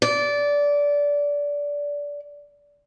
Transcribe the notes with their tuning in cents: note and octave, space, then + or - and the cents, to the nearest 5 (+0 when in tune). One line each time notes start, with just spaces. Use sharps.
D5 -20